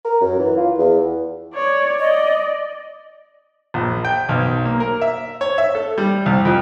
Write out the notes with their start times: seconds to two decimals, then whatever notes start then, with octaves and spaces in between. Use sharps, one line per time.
0.05 A#4
0.21 F#2
0.39 E3
0.57 F4
0.78 E2
1.54 C#5 D5
2.00 D5 D#5
3.74 A#1
4.05 G5
4.29 B1
4.65 A#3
4.80 A#4
5.01 E5
5.41 C#5
5.58 E5
5.75 A4
5.98 G3
6.26 C2
6.45 F2